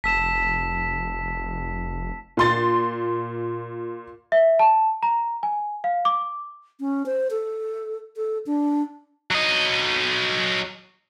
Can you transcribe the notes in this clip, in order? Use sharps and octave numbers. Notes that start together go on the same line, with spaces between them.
F1 A5 E6 B6 E7
A#2 C6 A6
E5
A5
A#5
G#5
F5
D6
C#4
C5
A4
A4
D4
F#3 D#5